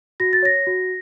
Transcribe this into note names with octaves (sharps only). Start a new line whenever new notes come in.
F#4 A#6
A6
C#5 A#6
F#4